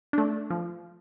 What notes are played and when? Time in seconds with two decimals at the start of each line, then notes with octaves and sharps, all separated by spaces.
0.13 A3 D4
0.50 F3